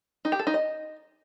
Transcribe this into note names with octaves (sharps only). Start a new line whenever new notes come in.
D#4
G4
A4
D#4
D#5